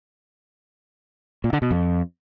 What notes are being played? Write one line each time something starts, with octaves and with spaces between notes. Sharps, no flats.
A#2
D3
B2
F2